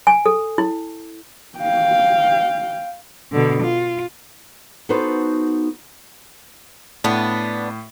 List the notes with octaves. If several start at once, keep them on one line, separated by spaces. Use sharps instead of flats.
G#5
A4
E4
F5 G5
B2 D3
F4
B3 D#4 F#4 A4 B4 C5
A2 B3 D4